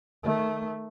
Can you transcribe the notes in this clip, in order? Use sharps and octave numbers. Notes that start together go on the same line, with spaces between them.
D#3 A3